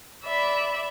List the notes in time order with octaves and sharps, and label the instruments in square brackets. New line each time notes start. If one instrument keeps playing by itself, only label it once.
[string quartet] D5 E5 B5